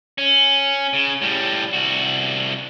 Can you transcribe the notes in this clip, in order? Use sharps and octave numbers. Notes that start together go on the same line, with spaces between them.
C#4
C#3
A2 G3
C2 F#4